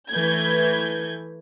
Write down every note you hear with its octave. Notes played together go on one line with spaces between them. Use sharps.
E3 A3 B4 G6 G#6